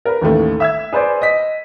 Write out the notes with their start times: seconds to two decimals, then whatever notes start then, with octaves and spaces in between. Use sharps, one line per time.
0.05 A#4 B4
0.22 A1 D#2 A3
0.60 E5 E6 G#6
0.93 G#4 B4 C5 D5
1.21 D#5 B6